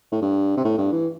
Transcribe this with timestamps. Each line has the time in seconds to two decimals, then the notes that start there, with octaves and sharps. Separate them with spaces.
0.12 A2
0.22 G2
0.57 C3
0.65 A2
0.78 G2
0.92 E3